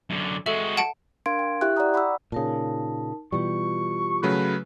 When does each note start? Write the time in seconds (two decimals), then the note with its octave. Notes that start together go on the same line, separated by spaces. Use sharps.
0.10 F#2 D3
0.46 G#3 F#4 A4 E5
0.77 F#5 A5 D7
1.26 D4 A#4 F5 C6 G#6 D7
1.39 G5
1.61 E4 G4 E5 G5 C#6 F#6
1.76 D5 F#5 G5 A#5 D#6
1.94 F#5 B5 C#6 D6 E6
2.32 A#2 C#3 D#4 A#4 A5
3.32 B2 E3 G3 F4 G4 C#6
4.23 C#3 F#3 A3 B4